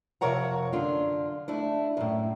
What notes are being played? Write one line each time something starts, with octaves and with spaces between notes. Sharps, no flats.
F2 C3 A#4 C#5 F#5 A#5
F#2 D3 D4 F4
A3 D4 E4
F#2 A2